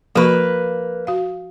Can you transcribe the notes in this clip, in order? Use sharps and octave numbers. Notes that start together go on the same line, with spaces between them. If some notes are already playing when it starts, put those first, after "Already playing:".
F3 A#3 F#4 B4 C#6
F#4 F5